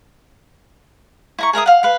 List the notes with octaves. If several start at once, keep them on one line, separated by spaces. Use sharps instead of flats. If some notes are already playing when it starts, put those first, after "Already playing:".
E4 A#5 C#6
G#4 A#4 E5 D#6
F5 F#5
B4 F5